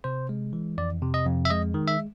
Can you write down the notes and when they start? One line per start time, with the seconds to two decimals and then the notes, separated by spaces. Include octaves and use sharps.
0.04 C3 C5
0.29 G#3
0.53 E3
0.78 F2 D5
1.02 C3
1.14 D#5
1.26 F2
1.45 E5
1.50 G#3 D#5
1.74 D#3
1.88 E5